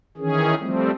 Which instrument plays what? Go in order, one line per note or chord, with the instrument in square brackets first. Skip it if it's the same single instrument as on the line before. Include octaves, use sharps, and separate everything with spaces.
[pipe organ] D#3 E3 C#4 G#4
F3 G3 A3 C4